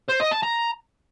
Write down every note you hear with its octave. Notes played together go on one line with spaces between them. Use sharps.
C5
D#5
A5
A#5